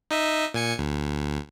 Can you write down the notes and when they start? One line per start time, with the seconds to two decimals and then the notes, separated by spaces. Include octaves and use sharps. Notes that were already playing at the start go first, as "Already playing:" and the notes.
0.11 D#4 D#5 E5
0.54 A#2 G#5 C#7
0.78 D2